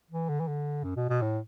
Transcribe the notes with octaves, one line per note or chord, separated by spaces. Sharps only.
E3
D3
E3
D3
F#2
B2
B2
A2